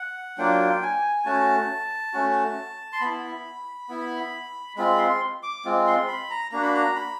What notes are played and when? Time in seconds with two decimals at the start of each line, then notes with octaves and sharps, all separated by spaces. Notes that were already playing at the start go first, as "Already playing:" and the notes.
Already playing: F#5
0.38 F#3 A#3 D4 F4 G5
0.83 G#5
1.25 A3 C#4 F#4 A5
2.13 A3 C#4 F#4
2.93 C6
3.01 B3 E4 B5
3.89 B3 E4
4.76 G#3 C4 F4 B5
4.98 C6
5.43 D6
5.65 G#3 C4 F4
5.87 C6
6.08 B5
6.30 A#5
6.52 A#3 D4 F#4 A#5
6.63 B5
6.74 A#5
6.96 B5